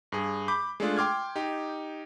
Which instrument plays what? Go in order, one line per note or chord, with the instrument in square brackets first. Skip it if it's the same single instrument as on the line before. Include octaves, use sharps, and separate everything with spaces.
[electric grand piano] G2 G#4
B5 D6 G6
G#3 A3 D4 F4
G5 C6 D6 F6 G#6
D#4 G4